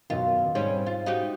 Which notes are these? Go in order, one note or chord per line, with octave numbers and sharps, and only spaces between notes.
F#2 B2 D#3 F4
G#2 G3 C4 C#4
F4
D#4 F#4 G4